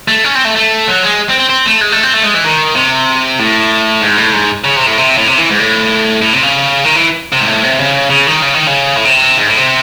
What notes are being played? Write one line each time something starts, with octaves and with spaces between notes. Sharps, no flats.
A3
C#4
C4
A3
A3
F#3
G#3
C4
C4
C4
A3
G#3
A3
C4
A3
G#3
E3
D#3
C3
A2
G#2
A2
G#2
C#3
C3
A2
C3
A2
C3
E3
G#2
A2
A2
C3
C#3
D#3
E3
C3
G#2
A2
C3
C#3
C#3
D#3
C#3
D#3
C#3
A2
C3
G#2
A2
C3